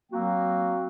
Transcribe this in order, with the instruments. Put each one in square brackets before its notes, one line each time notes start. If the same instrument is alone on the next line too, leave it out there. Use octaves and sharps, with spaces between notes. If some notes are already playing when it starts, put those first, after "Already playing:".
[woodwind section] F#3 A#3 C4 F#4 G5